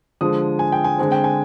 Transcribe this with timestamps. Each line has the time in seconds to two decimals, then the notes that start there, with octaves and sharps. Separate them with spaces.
0.21 D3 F3 G#3 D#6
0.59 G#5
0.72 G5
0.84 G#5
0.98 D3 G#3 C4 G#5
1.12 G5
1.24 G#5